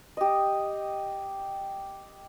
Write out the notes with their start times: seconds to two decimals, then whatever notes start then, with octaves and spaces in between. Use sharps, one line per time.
0.17 G4 D#5